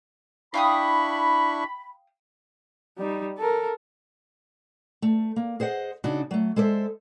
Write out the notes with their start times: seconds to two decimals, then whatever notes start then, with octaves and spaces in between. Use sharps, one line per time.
0.54 D4 E4 F5 G5 B5 C#6 D#6
2.98 G3 D#4
3.38 A4 A#4
5.02 A3
5.36 A#3
5.60 G#4 C5 D#5 F#5
6.04 C#3 D4 D#4 F#4
6.31 F#3 A3
6.56 G#3 A4 C5 D5 E5